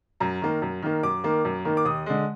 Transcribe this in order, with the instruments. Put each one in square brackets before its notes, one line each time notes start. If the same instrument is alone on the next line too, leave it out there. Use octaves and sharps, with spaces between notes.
[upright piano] F#2 A#5
D#3 A#3
F#2
D#3 A#3
F#2 D6
D#3 A#3
F#2
D#3 A#3
D6
D#2 D#6
D3 G#3